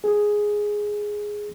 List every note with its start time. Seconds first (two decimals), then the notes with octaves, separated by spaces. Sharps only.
0.04 G#4